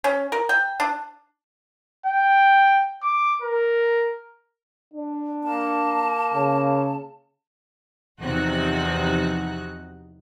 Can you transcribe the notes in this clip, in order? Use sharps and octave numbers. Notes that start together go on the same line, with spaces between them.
C#4
A#4
G5
D4
G5
D6
A#4
D4
A#3 A5
C#3
E2 C3 F3 D#4 F#4 F#6